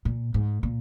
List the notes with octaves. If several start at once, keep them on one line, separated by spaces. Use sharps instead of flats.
A#2
G#2
A#2